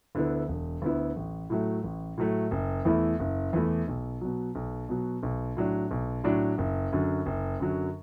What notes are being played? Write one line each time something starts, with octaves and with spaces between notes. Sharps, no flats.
D2 D3 B3 E4
E1
D2 D3 B3 E4
A1
A2 F#3 A3
A1
A2 F#3 A3
F#1
E2 E3 A3 E4
F#1
E2 E3 A3 E4
B1
B2 F#3
B1
B2 F#3
B1
A2 F#3 D4
B1
A2 F#3 D4
F#1
F#2 D3 F#3
F#1
F#2 D3 F#3